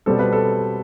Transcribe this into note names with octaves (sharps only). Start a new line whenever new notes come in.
B2 G3 C4 A4
B4
A4